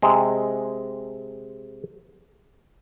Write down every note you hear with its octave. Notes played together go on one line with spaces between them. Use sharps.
C3 G#3